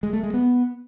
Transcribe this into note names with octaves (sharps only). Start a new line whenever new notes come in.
G#3
A3
G#3
B3